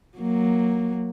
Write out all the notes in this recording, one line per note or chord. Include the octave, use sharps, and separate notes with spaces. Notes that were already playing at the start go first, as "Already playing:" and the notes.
F#3 A#3